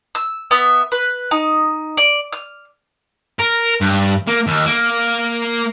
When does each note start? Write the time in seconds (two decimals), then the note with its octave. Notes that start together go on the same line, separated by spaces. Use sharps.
0.15 E6
0.51 B3 E5
0.92 B4
1.31 D#4
1.97 D5
2.33 F6
3.39 A#4
3.81 G2
4.28 A#3
4.47 D#2
4.66 A#3